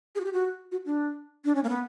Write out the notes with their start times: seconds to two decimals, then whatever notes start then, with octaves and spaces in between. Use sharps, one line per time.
0.15 G#4
0.20 F#4
0.25 G4
0.33 F#4
0.72 F#4
0.86 D4
1.45 D4
1.55 C#4
1.64 A#3
1.69 B3